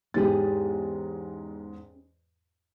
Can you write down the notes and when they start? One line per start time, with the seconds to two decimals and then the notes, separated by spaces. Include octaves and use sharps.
0.14 E2 G#2 C#4 G4 G#4 A6